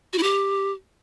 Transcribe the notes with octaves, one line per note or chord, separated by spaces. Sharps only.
F#4
E4
G4